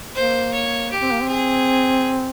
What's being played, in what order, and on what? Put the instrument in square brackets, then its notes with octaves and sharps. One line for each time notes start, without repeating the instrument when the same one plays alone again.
[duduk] A#3 [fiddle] C5
[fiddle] C#5
G4
[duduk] C4
A#3
C4
[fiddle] G#4